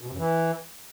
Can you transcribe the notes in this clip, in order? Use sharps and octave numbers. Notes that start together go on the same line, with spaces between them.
B2
C3
F#2
E3